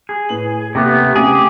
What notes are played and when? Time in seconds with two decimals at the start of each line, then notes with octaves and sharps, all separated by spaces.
0.09 G#4
0.29 A2 B4 F#7
0.75 D#2 C3 A3 B3
1.16 C#3 A3 C4 G4 G#4